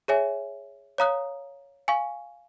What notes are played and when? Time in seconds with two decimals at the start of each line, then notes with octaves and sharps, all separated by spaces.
0.08 G#4 C#5 E5 G#5
0.98 C#5 F5 A#5 D#6 F#6
1.88 F5 G#5 C#6